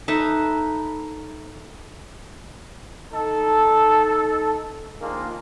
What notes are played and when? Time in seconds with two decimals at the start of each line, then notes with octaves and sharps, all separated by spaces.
0.08 D#4 A4 B4 E5
3.13 D#4 A4
5.01 D#3 F3 A#3 D4 F4 G#4